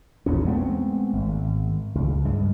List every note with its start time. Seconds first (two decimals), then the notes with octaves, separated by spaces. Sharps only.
0.26 A#1 E2 C#4
0.45 G#3 A3 B3 C4
1.13 G#1
1.95 C#2
2.25 G2 G#3